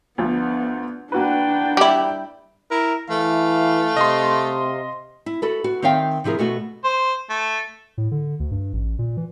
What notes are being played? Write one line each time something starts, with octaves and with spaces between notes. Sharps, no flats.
D2 F3 B3 D4
A#3 D4 F#4 B4 G5
G3 E4
E4 A#4
E3 A3 F5
C3 D#5 C6
E4
F#4 A4 B4
F#4
D#3 C4 C#5 E5 F5 G5
C3 F3 E4 G#4 A#4
B2 A3 B3 F#4
C5
A3
A2
D3
D2
G2
A1
A#2
E3